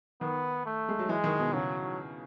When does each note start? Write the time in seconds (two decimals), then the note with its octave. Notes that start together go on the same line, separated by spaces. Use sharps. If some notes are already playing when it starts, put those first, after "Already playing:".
0.21 D#3 B3
0.66 A3
0.89 G#3
0.99 F#3
1.09 E3 G#3
1.24 D#3
1.39 B2
1.53 C#3 F#3